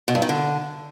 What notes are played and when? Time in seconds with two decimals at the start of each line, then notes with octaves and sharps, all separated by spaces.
0.08 B2
0.15 G2
0.22 D#3
0.29 D3